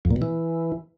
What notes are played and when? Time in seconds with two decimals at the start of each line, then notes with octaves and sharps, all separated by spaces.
0.05 F2
0.11 A#2
0.16 B2
0.22 E3